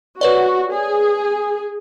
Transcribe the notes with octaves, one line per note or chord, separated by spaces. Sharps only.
F#4 B4 C#5 D5
G#4